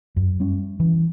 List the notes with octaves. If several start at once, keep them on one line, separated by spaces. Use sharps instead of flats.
F#2
G3 C#4
E3